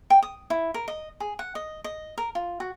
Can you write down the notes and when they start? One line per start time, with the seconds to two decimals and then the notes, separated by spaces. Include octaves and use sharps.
0.10 G5
0.23 D#6
0.50 E4
0.74 A#4
0.88 D#5
1.20 G#4
1.39 F#5
1.55 D#5
1.84 D#5
2.18 A#4
2.35 F4
2.60 F#4